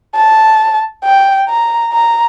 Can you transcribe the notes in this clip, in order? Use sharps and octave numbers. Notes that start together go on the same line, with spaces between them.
A5
G5
A#5
A#5